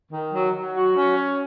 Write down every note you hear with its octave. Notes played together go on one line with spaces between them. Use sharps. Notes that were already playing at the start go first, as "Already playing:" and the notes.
D#3
F#3
F#3
F#4
C#4
C#5